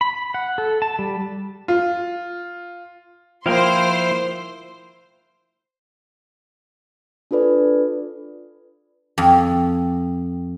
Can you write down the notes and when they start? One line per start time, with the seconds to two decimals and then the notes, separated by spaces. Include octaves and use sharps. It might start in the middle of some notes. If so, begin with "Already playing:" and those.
0.01 B5
0.34 F#5
0.58 A4
0.82 A5
0.99 G3
1.68 F4
3.46 F3 A#3 E4 C5 F5 G5 C6
7.31 D4 F4 A4 B4 D5
9.18 F2